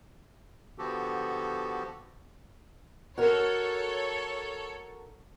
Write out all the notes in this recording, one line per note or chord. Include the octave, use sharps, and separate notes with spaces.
D3 F3 B3 F#4 G4 A4
F#4 A4 A#4 C#5